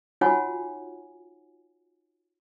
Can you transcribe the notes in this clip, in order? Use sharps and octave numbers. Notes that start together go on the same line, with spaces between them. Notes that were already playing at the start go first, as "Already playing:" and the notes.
D#4 F4 F#4 C#5 F#5 G#5